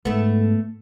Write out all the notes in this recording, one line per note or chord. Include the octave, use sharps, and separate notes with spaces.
G#2 A3 B3